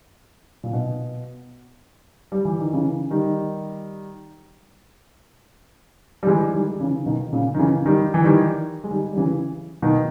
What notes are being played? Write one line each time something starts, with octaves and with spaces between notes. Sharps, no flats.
A#2
B2
G3
E3
D#3
C#3 E3
D#3 G3
G3
E3 G#3
D#3 G3
C#3 E3
B2 D#3
A#2 C#3
D#3
C#3 E3
D#3 G3
E3
D#3 G3
G#3
D#3 G3
G3
C#3 E3
B2 D#3